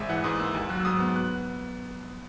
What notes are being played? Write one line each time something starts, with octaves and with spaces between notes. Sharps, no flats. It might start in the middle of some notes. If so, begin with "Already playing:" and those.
Already playing: G#1 G#3 E5
E3 F#5
G#2 D#6
A#3 E6
D#2
F#3 F#6
E6
G#2 D#6
B3
F#6